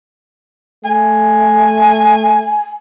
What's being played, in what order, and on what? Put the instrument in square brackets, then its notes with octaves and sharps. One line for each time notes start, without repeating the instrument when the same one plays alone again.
[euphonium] A3 [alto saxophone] G#5